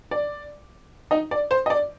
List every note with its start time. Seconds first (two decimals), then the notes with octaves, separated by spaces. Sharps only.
0.11 D5
1.11 D#4 D#5
1.31 D5
1.51 C5
1.66 D#5
1.70 D5